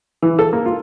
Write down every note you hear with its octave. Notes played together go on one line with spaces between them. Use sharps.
E3
A4
A#3
F4